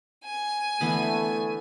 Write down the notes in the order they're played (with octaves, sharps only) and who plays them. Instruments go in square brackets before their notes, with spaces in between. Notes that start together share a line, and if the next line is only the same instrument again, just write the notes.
[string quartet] G#5
[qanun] D3 E3 B3 [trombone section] A3